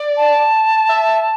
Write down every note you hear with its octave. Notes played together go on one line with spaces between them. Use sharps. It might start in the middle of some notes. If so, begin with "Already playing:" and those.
Already playing: D5
A5
E5